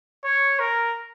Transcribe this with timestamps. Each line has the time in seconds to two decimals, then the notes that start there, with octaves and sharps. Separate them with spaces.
0.24 C#5
0.60 A#4